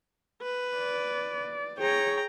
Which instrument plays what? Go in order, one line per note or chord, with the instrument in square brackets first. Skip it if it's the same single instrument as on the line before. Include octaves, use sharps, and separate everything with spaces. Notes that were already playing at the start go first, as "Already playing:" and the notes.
[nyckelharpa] B4
[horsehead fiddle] D5
[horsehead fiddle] G#4 C#5 [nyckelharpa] G5 A#5